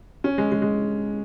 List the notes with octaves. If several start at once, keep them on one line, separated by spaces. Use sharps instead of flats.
C#4
G#3
G#3
G#3